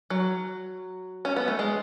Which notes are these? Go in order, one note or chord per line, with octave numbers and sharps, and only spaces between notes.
F#3
C#4
B3
A3
G#3